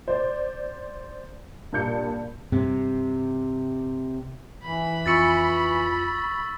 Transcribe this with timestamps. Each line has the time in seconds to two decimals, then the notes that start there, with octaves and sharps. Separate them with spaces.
0.08 C5 D5
1.73 G2 A#2 G6 C#7
2.52 G2 C3
4.64 E3 B5
5.06 F2 F4 C#6 E6 A6 C#7